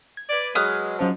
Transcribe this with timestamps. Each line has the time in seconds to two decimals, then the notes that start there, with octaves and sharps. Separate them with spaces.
0.17 G#6
0.29 B4 D5
0.55 F#3 G#3 B4 D#6 F6
0.99 G#2 F3 F#3 C#4 A5